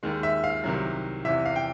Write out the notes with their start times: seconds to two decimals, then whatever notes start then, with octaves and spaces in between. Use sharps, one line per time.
0.03 D#2 D#3 G#3
0.23 E5
0.44 F5
0.64 C2 C3 D#3 F#3
1.25 E2 C3 E3 E5
1.45 F5
1.56 G5